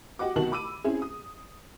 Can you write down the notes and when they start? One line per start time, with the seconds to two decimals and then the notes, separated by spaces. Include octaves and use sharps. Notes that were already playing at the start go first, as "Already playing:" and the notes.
0.19 F#4 G4 D#5 F#5 D6
0.36 C2 B2 D#3 F#4 A5 F#7
0.52 B5 D6 E6 D#7
0.84 C4 C#4 E4 G#4
1.02 D#6